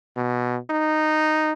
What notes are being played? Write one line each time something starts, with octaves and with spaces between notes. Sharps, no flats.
B2
D#4